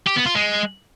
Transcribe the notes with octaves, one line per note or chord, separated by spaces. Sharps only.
G4
B3
F4
G#3